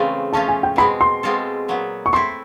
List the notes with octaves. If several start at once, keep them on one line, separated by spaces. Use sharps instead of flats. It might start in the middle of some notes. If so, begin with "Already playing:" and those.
Already playing: C#3 E3 A3 C4 F4
F3 A3 C#4 F4 A5
G#5
G5
B2 G#3 C4 B5
C6
B2 G#3 C4 F4 A4
A#2 F#3 B3
C#6
A3 C4 E4 C6